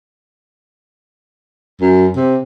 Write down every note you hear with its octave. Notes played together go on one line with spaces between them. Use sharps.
F#2
C3